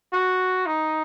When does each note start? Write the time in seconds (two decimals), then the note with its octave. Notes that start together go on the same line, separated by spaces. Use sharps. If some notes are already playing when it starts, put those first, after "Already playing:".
0.13 F#4
0.66 D#4